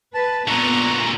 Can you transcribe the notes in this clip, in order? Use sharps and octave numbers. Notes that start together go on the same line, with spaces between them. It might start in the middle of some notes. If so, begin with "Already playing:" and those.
B4 A5
A#2 D3 B3 A#5 C#6 F#6